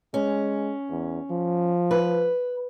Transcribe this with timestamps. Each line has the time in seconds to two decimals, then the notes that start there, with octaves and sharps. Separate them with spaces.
0.14 G#3 C#4
0.91 E2
1.31 F3
1.91 B4